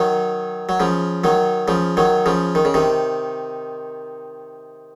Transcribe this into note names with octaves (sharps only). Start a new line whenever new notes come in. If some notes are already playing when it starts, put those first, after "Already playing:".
Already playing: D#3 F#3
F#3
C#3 F3
D#3 F#3
C#3 F3
D#3 F#3
C#3 F3
D#3
C#3
C3 D#3